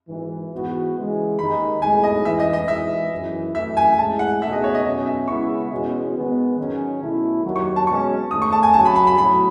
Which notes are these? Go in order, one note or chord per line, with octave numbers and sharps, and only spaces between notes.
G#1 G#2 E3
G#2 E3 B3 F#4
C#3 E3 G#3
D#2 D#3 G#3 D#4 B5
B1 A2 G#3 G#5
D#5
A1 G#2 E3 E5
D#5
D#5
G#1 G#2 E3 E5
G#1 F#2 E3
F#2 E3 A3 E5
G#5
A1 A2 G#3 A5
F#5
C#2 B2 A3 D#4 G#4 E5
D#5
C#5
D#5
B1 B2 F#3 C#4 D#5
E5
C#3 G#3 B3 E4 C#6
E2 B2 G#3 C#4 F#4
G#2 D#3 G#3 B3
G#2 D#3 F#3 C#4 G#4
B1 B2 A3 E4
D#2 D#3 F#3
C#6
A5
B2 G#3 C#4 C#6
G#2 D#3 A3 D#6
C#6
A5
G#5
F#2 C#3 F#3 A5
B5
B5
B5
B1 A2 F#3 B5